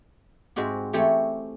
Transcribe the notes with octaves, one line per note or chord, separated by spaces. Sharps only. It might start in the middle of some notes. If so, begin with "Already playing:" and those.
G#2 G#3 C4 F#4 G4
E3 A3 C4 G4 C#5